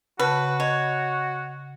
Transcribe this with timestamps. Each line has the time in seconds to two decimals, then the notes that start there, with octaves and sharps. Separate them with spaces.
0.19 C#3 F#4 B4 A5
0.60 C#5 D#5